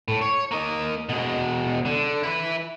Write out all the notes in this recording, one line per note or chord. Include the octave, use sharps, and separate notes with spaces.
A2
C#5
A#3 D#5
B2 G#3
D3
E4 B4